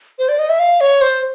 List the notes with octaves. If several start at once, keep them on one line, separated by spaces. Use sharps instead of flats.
C5
D5
D#5
E5
F5
C#5
C5